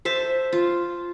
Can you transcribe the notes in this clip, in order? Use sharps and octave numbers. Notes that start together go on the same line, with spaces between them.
C5 E5 A5
F4